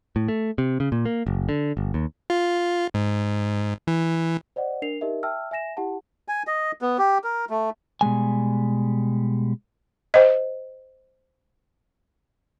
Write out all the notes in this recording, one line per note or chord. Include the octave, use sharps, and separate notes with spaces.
A2
A3
C3
C#3
A#2
A#3
F#1
D3
G1
D#2
F4
G#2
E3
C5 D5 D#5 F#5
D4 A#4 C7 F7
D#4 G4 A#4 D#5 E5
E5 G5 A5 E6 F6
E5 G#5 A#6 E7
E4 G4 F#5 A5
G#5
D#5
B3
G4
A#4
A3
B2 G3 G#3 G#5
C5 D#5